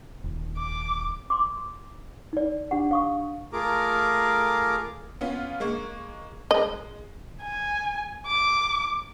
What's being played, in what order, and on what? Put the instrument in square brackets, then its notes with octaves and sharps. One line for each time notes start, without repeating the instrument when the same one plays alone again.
[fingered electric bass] D#1
[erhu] D6
[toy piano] C6 D6
D#4 D5
D4 G4 F#5
F5 C#6 D#6
[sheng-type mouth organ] A3 F4 G#4 A#4 A#5 D6
[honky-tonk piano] B3 C#4 F4
G#3 A#3 C#6
[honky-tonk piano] G#3 [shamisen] D#5
[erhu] G#5
D6